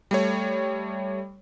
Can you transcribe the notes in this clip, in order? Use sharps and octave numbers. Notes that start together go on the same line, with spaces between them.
G3 A3 C#5